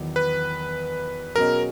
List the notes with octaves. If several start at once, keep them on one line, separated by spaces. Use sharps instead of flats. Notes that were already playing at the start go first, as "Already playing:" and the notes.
Already playing: E2 D#3 F#3 B3
B4
B2 F#3 C#4 G#4 A#4 D#5